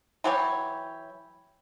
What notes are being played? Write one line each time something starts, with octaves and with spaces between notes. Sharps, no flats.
E3 F#3 G4 C#5